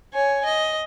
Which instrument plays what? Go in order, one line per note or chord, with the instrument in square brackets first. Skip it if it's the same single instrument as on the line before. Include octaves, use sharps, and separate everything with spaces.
[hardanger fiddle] C#5 G#5
D#5